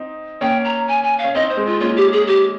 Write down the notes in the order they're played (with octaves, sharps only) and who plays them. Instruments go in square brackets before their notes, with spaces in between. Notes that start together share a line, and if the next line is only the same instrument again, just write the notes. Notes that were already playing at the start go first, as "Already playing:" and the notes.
Already playing: [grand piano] C4 D#4
[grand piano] A#3 C#4 [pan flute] G5
[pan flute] A#5
G#5
G#5
F5
[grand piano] C#4
[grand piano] C4 D#4 [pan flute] D#5
[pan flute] C5
[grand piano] G#3 C4
[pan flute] F4
[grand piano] A#3 C#4 [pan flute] F4
[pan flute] G4
G#4
G4